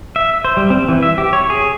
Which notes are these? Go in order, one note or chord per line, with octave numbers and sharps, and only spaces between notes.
E5
C5
G3
C4
E3
E5
G4
C#5
G#4